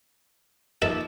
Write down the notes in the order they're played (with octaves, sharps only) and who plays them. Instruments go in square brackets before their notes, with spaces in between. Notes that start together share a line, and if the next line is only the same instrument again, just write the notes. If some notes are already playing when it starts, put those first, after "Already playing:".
[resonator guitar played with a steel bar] F3 A#3 D#4 [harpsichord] A4 E5